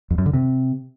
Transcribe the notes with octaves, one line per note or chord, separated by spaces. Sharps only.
F2
F#2
D3
C3